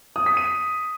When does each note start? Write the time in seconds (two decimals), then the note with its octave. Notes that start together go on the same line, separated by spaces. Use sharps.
0.16 D#6
0.26 B6
0.37 D#7